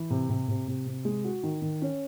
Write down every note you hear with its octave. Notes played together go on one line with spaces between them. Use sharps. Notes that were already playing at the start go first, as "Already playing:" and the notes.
Already playing: E3
C3
C3
C3
C3
C3
G#3
F#4
D#3
D#3
C#4